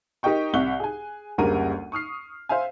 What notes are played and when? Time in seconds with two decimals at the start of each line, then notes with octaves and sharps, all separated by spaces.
0.23 D#4 G4 A#4 D#5 G5 C#6
0.53 C2 E5 C#6 F#6 G7
0.80 G#4 G#5
1.38 F#1 D2 C#3 G3 A#4 D#7
1.92 C#6 D#6 F6 C7
2.49 C5 E5 F5 G#5